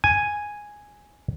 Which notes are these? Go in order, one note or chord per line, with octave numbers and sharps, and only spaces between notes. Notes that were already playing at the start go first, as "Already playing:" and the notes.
G#5